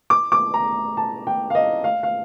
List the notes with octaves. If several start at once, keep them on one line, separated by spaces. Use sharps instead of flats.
D6
D6
A#5
A5
G5
F5
D#5
F5
F5